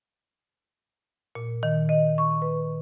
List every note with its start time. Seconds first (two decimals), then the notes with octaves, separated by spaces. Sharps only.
1.35 A#2
1.63 D#3
1.89 D#5
2.18 C#6
2.42 B4